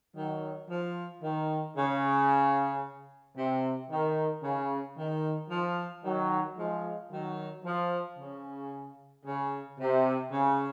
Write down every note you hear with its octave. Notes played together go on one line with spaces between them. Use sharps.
D#3 F#3
F3
D#3
C#3
C3
D#3
C#3
D#3
F3
D#3 F#3
F3 G#3
D#3 F#3
F3
C#3
C#3
C3
C#3